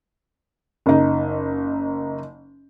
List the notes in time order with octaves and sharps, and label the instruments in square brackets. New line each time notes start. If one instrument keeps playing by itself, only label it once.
[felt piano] F#1 D#4